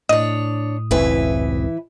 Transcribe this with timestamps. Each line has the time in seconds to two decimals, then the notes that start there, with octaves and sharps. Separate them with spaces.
0.09 A2 D4 C#5 D#5 D#6
0.91 F#1 C#2 E3 C4 E4 B4